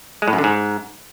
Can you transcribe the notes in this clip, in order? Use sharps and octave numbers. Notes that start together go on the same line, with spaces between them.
G#3
A2
F#2
D3
G#2